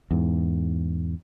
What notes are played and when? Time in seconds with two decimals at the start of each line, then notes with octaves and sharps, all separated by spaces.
0.11 E2 G#2